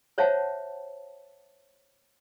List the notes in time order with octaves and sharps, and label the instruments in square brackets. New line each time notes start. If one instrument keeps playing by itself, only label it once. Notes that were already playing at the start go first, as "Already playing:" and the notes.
[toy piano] C5 C#5 E5 F#5 A5